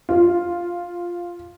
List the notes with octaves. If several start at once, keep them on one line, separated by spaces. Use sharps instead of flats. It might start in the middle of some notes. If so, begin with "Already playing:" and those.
F4